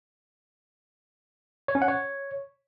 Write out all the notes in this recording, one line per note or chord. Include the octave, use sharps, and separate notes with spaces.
C#5
C#4
F#5
C#5